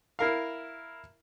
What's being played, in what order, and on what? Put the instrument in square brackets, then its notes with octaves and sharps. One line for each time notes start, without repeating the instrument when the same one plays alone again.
[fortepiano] E4 A#4 F5